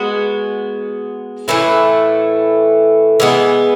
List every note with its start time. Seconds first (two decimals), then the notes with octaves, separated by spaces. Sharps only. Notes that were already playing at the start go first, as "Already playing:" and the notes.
Already playing: G#3 B3 F#4
1.48 A2 E3 A3 E4
3.20 E3 G#3 B3